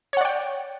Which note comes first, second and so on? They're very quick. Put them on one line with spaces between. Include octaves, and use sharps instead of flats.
C#5 F#5 D5 G5